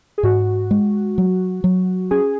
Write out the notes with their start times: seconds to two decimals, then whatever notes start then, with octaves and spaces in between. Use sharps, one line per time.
0.18 G#4
0.23 G#2 F#4
0.71 G#3
1.18 F#3
1.64 F#3
2.11 C#4 G#4